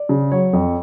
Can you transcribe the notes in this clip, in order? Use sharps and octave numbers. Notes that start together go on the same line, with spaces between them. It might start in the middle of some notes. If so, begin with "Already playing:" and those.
Already playing: D5
C#3
F#3 C#5
F2